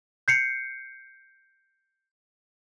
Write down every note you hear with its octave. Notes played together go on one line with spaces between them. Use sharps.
G6 C7 C#7